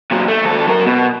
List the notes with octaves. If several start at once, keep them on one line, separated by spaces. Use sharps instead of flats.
A#2 F#3
A3
D#2 A4
F#3 A#4
B2